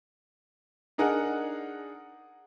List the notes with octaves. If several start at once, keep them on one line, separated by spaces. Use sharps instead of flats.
D4 D#4 G#4 A#4 F#5